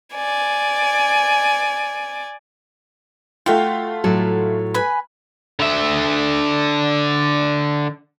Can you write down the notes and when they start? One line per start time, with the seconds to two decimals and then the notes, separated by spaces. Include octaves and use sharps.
0.14 D5 G#5
3.46 A3 F4 F#4 F5 G5
4.04 A2 F#3 A4
4.74 B4 G#5 B5
5.60 D3 E5